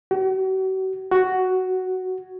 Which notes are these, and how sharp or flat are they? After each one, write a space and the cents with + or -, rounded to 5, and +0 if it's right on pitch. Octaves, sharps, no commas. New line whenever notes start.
F#4 +40
F#4 +5